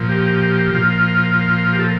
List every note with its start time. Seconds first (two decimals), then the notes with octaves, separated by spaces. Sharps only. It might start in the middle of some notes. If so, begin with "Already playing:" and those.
Already playing: A#2 F3
0.09 G4
0.74 A#2 F3 F4
1.73 G4
1.79 A4